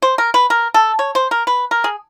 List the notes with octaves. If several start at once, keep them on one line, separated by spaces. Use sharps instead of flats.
C5
A#4
B4
A#4
A4
C#5
C5
A#4
B4
A#4
G#4